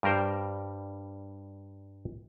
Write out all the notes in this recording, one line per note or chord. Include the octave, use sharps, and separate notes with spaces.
G2 G3 A#4 C5 G5